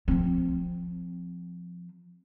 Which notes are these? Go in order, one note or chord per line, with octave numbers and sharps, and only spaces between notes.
F3 C4